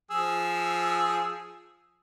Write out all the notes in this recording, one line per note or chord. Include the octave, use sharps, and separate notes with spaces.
F3 G#4 E6